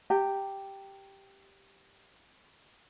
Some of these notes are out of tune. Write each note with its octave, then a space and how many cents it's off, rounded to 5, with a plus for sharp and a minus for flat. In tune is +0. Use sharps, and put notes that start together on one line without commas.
G4 +0 A#5 -35